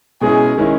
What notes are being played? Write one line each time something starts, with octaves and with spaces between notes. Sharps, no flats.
B2 G#3 C#4 E4 G#4
D#3 G#3 C#4 E4